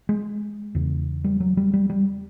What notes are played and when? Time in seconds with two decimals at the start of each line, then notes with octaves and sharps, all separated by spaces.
0.09 G#3
0.75 E2 C#3
1.24 G3
1.40 F#3
1.57 G3
1.73 G3
1.90 G3